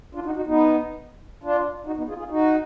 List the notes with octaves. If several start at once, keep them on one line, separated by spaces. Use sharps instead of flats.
D4 F4
D#4 F#4
D#4 F#4
B3 D#4
D4 F4
D#4 F#4
B3 D#4
F4 G#4
F4 G#4
D#4 F#4